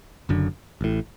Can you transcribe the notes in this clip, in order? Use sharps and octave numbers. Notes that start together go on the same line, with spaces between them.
F#1 F#2 D3
A1 A2